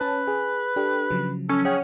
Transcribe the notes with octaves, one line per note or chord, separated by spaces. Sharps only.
C#4 B4 A5
G#4
D4 G4 A4
C#3 F3 F#3
C#4 A4
G#4 C#5 F#5 G5